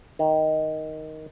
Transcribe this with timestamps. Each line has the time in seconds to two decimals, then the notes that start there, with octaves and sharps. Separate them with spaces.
0.19 D#3